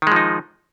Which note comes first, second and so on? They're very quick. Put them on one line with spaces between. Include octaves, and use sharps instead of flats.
D#3 G#3 F3 D#4